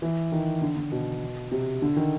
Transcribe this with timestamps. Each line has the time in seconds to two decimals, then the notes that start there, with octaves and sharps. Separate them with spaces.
0.02 E3
0.32 D#3
0.62 D3
0.77 D3
0.92 B2
1.52 C3
1.82 D3
1.96 D#3